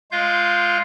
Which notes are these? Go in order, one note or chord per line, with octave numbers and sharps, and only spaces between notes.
G#3 F4 F5 G6